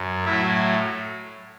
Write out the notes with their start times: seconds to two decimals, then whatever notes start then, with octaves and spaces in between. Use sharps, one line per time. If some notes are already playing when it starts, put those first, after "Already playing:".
Already playing: F#2
0.25 A2 F#3 E4